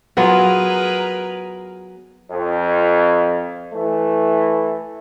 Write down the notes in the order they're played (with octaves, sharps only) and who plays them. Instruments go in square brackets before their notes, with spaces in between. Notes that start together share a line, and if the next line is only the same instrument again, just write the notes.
[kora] F#3 B3 F4 [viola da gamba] G#4 A#4 B4
[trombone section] F2
E3 A3